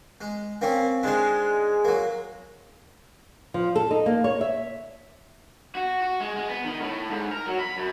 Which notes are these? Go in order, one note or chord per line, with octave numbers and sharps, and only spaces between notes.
G#3
A#3 C4 C#4
G#2 G#3 D4 C5
F#3 A#3
F3
A4
D#4
A#3
C#5
E5
F#4
F#4
G#3
G#3
B3
D#3
A2
G#2
A#4
F#3
B5
F#2